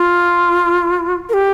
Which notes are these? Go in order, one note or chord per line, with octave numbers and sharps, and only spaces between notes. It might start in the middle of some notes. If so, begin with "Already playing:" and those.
Already playing: F4
A#4
G4